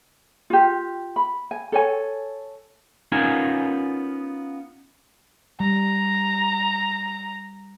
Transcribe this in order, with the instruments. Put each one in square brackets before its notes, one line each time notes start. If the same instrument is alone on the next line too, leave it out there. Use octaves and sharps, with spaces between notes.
[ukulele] F4 G4
B5
G#5
A4 C#5 G#5
[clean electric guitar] B3 C#4 D#4 F4 A#4 G#5
[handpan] G3 [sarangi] A#5